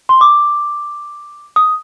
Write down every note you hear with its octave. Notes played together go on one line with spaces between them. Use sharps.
C6
D6
D#6